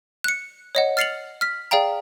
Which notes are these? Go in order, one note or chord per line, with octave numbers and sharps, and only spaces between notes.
F#6 C#7
C#5 D#5 F#5
F6 A6 C7 C#7 F7 F#7
F6 B6
G#4 D5 F5 G5 A#5